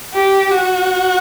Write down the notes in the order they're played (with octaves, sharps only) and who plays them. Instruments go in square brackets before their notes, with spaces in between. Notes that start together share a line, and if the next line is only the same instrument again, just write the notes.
[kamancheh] G4
F#4